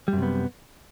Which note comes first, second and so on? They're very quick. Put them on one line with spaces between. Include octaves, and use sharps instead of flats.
G3 F#2 C3 B3